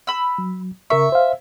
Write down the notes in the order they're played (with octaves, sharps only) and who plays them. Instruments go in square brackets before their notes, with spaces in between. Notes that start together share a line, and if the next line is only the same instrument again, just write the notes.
[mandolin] B5 E6
[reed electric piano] F#3
[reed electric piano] C#3 A#4 C#6 [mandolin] E5
[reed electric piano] C5 F5